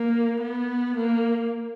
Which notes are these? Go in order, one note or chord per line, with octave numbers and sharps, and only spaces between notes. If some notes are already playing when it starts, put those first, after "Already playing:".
Already playing: A#3
B3
A#3